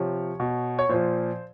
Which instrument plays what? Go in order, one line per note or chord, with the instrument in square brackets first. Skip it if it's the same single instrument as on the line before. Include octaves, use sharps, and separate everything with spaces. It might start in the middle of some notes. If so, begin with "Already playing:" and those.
Already playing: [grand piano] C3 F3 C#5
B2
C#5
A#2 F3 C5